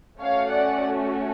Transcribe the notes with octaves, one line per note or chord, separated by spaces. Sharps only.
A3 C#4 F#4 C#5 F5
D5 F#5